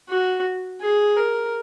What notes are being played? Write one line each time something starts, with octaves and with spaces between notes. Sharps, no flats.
F#4
G#4
A#4